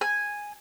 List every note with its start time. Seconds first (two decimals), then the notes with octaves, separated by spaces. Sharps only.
0.01 G#5